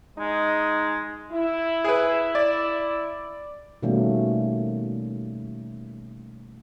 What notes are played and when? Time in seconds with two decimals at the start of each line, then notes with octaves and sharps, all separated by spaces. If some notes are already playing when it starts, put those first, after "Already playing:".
0.18 G#3 D#4
1.31 E4
1.84 G#4 B4
2.35 D5
3.82 B2 D#3 G3 A3 A#3 C#4